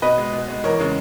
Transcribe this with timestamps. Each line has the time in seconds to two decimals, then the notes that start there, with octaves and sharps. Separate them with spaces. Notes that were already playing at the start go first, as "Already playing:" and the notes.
0.02 B2 B4 D#5
0.18 G#3
0.33 B2
0.48 G#3
0.64 E2 A#4 C#5
0.79 C#3 G#3